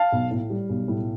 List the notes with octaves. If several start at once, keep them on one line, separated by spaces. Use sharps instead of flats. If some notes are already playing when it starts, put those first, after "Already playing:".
Already playing: F5 A5
B1
A2
G3
B1
A2